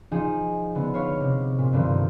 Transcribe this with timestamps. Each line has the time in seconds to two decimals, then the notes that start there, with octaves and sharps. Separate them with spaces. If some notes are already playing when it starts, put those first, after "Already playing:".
0.11 F3 D#4 G#4
0.75 D3 B3
0.94 B4 C#5 F5
1.20 C3
1.59 A#2
1.72 C2 G2 D3 D#3 F3